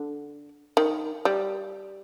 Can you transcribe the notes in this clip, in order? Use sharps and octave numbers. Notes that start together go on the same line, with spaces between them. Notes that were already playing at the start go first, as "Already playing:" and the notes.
Already playing: D3
D#3
G3